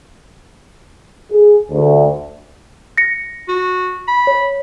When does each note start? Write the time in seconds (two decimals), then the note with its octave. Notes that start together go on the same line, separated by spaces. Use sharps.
1.32 G#4
1.71 D2
2.98 A#6 C#7
3.48 F#4
4.08 B5
4.27 C#5